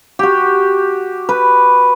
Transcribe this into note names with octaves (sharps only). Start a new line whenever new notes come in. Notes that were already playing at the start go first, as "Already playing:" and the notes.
F#4 G4
B4